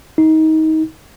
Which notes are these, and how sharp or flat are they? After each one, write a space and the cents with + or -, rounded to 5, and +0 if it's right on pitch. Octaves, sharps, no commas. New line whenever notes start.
D#4 +25